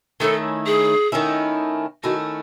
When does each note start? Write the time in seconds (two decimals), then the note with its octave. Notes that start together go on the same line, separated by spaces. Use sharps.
0.20 D#3 A3 C#4 E4 A4
0.66 G#4
1.12 D#3 A3 C#4 E4
2.03 D#3 A3 C#4 E4 F#4